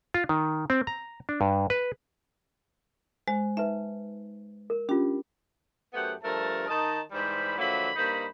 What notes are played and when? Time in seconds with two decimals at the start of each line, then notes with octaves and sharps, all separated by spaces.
0.14 F4
0.29 D#3
0.70 C4
0.87 A#5
1.29 D4
1.41 G2
1.70 B4
3.28 G#3 C5
3.57 D#4 B4 E5
4.70 A#4
4.89 C#4 D4 F4 G4
5.94 F#2 A3 B3 G4 C5 F#5
6.22 G2 F3 A3 A#4 A5
6.67 D#3 D#4 D#5 A5
7.11 G#2 E3 G3 C5 B5
7.58 D3 F3 F#3 A#3 E5 B5
7.96 G2 A#3 D#4 C5 B5